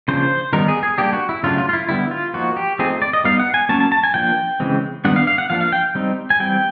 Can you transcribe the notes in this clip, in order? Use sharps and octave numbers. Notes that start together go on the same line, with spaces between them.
C#3 F3 A#3 D4 C5
D#3 G3 B3 D#4 A#4
G#4
G#4
G3 A#3 D4 G4
F#4
E4
C#3 F#3 A3 D4 F4
F4
F4
E4
D3 G3 B3 E4
F4
F3 A#3 D#4 F#4
G4
F3 A3 C4 D#4 G#4
D5
D#5
G3 B3 D#4 F5
F#5
G#5
F#3 A#3 C#4 A5
A5
A5
G#5
F3 A#3 D4 G5
C#3 E3 G#3 C4
D#3 G3 B3 D4 F#5
F5
F5
F#5
F3 A#3 D4 F5
F5
G5
G3 C4 D#4
G#5
E3 G3 C4 G5